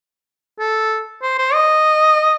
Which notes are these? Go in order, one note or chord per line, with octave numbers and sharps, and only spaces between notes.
A4
C5
C5
D#5